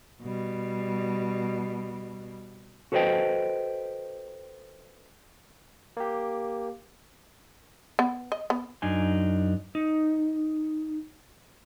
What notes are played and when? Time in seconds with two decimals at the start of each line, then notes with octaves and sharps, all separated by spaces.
0.23 B2 G3
2.92 F#4 A4 B4 C5 D#5 G5
5.97 A#3 G4
7.99 B3
8.32 D#5
8.50 B3
8.82 F#2 D4 D#4 G#5
9.75 D#4